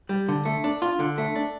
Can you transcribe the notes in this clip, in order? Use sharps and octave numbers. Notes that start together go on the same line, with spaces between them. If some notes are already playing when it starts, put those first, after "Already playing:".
G3
D3
A3
D4
F4
D3
A3
D4